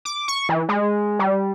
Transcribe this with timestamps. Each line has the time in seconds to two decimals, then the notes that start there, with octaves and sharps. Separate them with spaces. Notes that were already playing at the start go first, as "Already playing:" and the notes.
0.05 D6
0.28 C#6
0.49 E3
0.69 G#3
1.19 G3